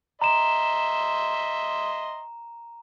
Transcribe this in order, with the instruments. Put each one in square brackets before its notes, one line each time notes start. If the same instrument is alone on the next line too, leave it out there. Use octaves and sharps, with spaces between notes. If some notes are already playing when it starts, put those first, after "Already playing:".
[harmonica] D#5 E5 C6 [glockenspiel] A#5 E7